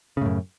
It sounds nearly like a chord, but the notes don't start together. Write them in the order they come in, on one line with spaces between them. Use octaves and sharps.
C#3 A2 F#2